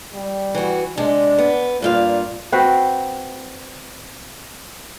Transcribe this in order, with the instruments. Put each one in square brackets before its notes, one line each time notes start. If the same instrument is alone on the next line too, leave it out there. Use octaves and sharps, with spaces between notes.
[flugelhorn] G3
[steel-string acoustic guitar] E3 F#4
[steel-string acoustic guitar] C3 G#3 [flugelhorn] D4
[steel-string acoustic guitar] B3
[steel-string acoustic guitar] G2 A#2 F5 [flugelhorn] F4
[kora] C4 F#4 B4 C5